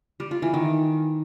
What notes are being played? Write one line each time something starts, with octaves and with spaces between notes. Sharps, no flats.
G3
F4
E3
D#3